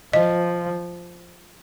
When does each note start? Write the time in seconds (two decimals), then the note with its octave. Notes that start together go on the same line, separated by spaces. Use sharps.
0.13 F3 D#5